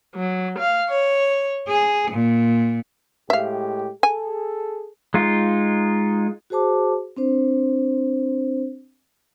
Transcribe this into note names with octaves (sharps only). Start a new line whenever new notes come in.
F#3
F5
C#5
G#4
A#2
A2 G#3 G4 E5 F5
G#4 A4 G#5
G#3 D#4 F4
F#4 G#4 C5 A5 D6
C4 D4 C5